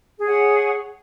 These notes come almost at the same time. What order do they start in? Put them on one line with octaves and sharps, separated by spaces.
G#4 C#5 F#5